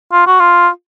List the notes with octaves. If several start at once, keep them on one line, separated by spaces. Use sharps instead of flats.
F4
F#4
F4